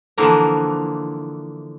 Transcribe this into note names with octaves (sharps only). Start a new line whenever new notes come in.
D3 E3 F3 A#3